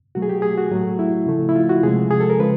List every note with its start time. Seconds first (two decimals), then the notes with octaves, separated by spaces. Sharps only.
0.15 B2 F#3 A3 F#4
0.22 G#4
0.29 G4
0.42 G#4
0.57 F#4
0.71 A2 F#3 A3
0.99 E4
1.26 C#3 F3 A3
1.49 E4
1.56 F4
1.69 F#4
1.83 C3 F3 G#3 G#4
2.10 G#4
2.20 A4
2.30 A#4
2.39 C#3 F3 G#3 B4